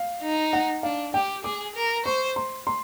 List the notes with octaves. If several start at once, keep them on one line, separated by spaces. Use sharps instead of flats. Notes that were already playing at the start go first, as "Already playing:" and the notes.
Already playing: F5
D#4
F#5
D4 F5
G4 G5
G#4 D6
A#4
C5 C#6
C6
C6